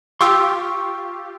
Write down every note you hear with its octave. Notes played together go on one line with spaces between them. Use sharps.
F4 G4 C6 C#6 E6